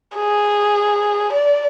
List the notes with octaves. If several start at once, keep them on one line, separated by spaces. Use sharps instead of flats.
G#4
D5